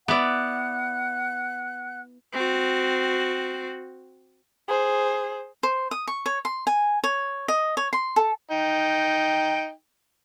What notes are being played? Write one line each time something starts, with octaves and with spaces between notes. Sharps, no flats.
B3 E4 D5 F#5 F#6
C4 F#4
G#4 C5
C5
D#6
C#6
C#5
C6
G#5
C#5
D#5
C#5
C6
A4
D#4 G5